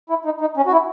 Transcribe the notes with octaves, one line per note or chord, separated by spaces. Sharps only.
E4
D#4
D#4
C#4
F#4
E4